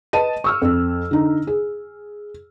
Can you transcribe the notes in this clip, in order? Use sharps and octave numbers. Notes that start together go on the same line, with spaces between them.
B4 D#5 A5 D#7
C#6 E6 F6
F2
D3 D#4
G#4